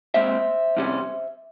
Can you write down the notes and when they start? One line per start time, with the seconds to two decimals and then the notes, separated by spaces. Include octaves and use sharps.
0.14 A#2 G#3 C4 C5 E5
0.77 F2 C3 G3 C#4